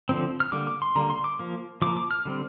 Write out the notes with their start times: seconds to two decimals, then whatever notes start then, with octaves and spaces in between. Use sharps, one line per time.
0.09 D3 F3 C4
0.40 F6
0.52 D3 G3 A#3 D6
0.67 D6
0.82 C6
0.95 D3 G3 A#3 A#5
1.10 C6
1.24 D6
1.39 F3 A#3
1.82 F3 A#3 D6
1.97 D6
2.11 F6
2.25 D3 G3 C4